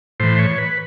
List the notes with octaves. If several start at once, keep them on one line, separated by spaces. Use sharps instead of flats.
A2 E3 C5
C#5
B4